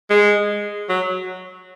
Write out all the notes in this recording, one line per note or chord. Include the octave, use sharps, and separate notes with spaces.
G#3
F#3